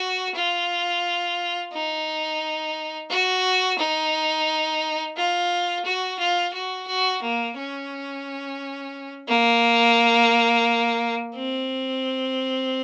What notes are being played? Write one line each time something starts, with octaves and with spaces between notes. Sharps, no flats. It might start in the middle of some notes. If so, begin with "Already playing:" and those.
Already playing: F#4
F4
D#4
F#4
D#4
F4
F#4
F4
F#4
F#4
A#3
C#4
A#3
C4